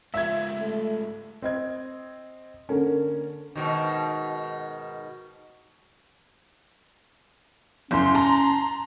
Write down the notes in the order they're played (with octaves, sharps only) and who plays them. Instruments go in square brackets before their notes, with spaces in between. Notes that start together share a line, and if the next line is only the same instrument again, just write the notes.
[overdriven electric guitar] G#2 F4 [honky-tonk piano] E5 G#6
[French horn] A3
[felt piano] C4 D#5 G#6
D3 A#3 C#4
[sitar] G#2 B2 D#3
[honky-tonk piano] F#1 C6 [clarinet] C#4
[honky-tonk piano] A5 A#5 C6